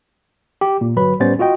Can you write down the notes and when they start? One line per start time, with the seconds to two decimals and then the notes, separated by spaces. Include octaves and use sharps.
0.61 G4
0.81 A#2
0.96 G1 F#3 B4 B5
1.20 A2 G3 B3 C#4 C5 A6
1.39 F4 F#4 D#5 G5